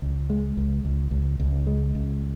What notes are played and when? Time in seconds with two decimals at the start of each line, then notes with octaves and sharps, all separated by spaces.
0.02 C#2
0.30 G#3
0.57 C#2
0.85 C#2
1.11 C#2
1.40 C#2
1.67 G#3
1.95 C#2